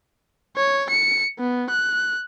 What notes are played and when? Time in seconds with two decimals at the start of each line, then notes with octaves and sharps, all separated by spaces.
0.56 C#5
0.90 C#7
1.39 B3
1.70 F#6